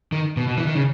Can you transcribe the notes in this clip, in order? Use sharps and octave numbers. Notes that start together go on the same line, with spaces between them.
D#3
B2
B2
E3
D#3
C#3